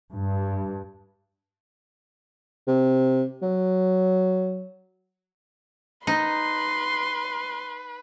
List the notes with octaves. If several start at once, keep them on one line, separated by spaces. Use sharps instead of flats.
G2
C3
F#3
D#4 B4 C6